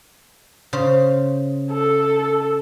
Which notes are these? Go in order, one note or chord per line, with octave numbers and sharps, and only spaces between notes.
C#3 C5
A4